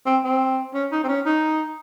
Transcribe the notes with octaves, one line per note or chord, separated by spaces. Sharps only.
C4
C4
C#4
D#4
C4
C#4
D#4